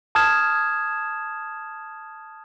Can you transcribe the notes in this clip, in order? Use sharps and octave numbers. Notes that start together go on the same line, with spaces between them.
A5 D#6 F6 G#6 E7